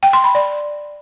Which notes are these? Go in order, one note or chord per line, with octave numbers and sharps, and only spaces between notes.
G5
C6
B5
D5